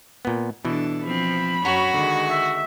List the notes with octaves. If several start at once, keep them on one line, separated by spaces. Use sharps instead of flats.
A#2 B3
B2 E3 D4 A4
F3 C4 B5
F#2 F#4 C#5 A#5
D3 D#3 G#3
E5